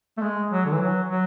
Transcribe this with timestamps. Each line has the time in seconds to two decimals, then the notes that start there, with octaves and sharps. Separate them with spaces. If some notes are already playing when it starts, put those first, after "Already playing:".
0.17 A3
0.21 G#3
0.51 F#3
0.65 D3
0.73 E3
0.80 F#3
1.09 F#3